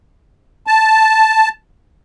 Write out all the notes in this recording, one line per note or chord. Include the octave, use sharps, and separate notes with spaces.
A5